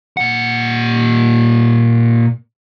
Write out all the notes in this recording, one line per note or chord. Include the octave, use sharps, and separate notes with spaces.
A#2 F#5